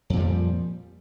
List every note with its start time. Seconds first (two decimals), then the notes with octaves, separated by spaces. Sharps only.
0.10 F2
0.13 A#2
0.17 F3
0.20 G3